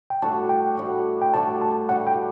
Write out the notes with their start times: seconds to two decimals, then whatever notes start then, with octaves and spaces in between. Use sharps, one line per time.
0.10 G5
0.22 A2 G3 D4 F#4 A5
0.49 G5
0.77 A2 G3 D4 F#4
1.22 G5
1.33 A2 G3 D4 F#4 A5
1.62 A5
1.89 A2 G3 D4 F#4 F#5
2.07 G5